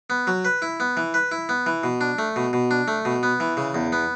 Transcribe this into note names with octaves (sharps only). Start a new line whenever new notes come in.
B3
F#3
B4
E4
B3
E3
B4
E4
B3
E3
B2
D4
A3
B2
B2
D4
A3
B2
B3
E3
C#3
E2
B3